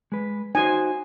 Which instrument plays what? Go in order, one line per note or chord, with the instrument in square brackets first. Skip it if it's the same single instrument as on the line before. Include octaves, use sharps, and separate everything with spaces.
[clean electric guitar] G#3 B4
[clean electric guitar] D#4 F#4 C5 [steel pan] G#5